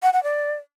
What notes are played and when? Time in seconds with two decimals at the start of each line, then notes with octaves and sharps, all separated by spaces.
0.03 F#5
0.13 F#5
0.23 D5